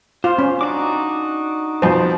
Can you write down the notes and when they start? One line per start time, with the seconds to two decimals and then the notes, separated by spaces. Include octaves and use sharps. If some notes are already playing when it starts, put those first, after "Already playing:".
0.24 F4 C5
0.39 C#4
0.61 D4 D#4 F#4 D6
1.82 F2 B2 C5